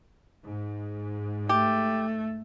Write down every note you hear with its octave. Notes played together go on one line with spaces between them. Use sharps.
G#2
A3 G4